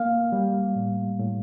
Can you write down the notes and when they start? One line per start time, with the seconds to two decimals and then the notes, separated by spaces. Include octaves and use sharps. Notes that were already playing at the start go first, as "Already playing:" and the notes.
Already playing: A#3 F5
0.32 G3
0.76 A2
1.19 A2